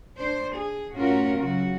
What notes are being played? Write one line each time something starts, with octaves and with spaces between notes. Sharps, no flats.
D4 C5
G#4
A2 C#4 F4 F#4 A#4
C#3 F#3 F#4